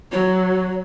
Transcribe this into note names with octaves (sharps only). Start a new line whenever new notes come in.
F#3 C#5